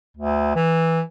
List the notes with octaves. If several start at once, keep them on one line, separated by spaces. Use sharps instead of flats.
D2
E3